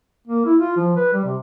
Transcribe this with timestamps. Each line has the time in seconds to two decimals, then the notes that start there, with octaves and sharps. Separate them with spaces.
0.27 A#3
0.46 E4
0.60 F4
0.77 F3
0.97 B4
1.13 G3
1.25 C3